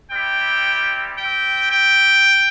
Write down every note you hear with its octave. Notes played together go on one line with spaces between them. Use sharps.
G3 C4 E4 G4 G5
C4 G4 G5
G5